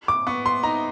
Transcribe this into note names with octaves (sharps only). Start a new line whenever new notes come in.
D6
B3 C#6
C6
D#4 A#5